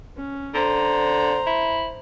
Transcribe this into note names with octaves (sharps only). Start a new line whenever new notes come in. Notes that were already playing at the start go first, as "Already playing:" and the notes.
C#4
D3 C5 A#5
E4